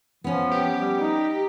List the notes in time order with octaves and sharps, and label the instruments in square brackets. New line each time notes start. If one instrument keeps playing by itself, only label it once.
[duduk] F3 [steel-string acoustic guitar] B3 C#4
[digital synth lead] G4
[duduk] G3
D#4